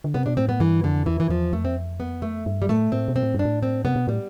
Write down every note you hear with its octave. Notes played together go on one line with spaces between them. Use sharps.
D3
C3 B3
B2 D4
A2 C4
B3
G2 E3
F2 D3
E2 E3
E3
E2 F3
F2 A3
C4
B3
A3
G2
G3
A2 A3
A2 C4
B2
C4
A2
G2 D4
A2
C4
C3 B3
B2
A2 G3